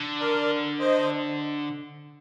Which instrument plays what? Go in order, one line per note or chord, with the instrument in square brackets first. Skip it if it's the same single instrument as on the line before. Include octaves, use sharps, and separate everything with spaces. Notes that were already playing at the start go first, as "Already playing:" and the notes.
Already playing: [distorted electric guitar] D3
[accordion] A#4 D5
C5 D#5